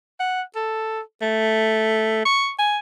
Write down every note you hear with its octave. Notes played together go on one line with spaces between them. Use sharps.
F#5
A4
A3
C#6
G#5